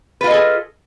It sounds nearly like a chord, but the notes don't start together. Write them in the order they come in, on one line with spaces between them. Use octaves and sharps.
B4 F4 D#5 A4 G#4